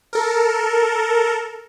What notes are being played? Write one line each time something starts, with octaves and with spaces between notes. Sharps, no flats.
A4 A#4